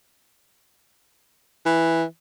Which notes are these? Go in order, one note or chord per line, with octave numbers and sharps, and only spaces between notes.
E3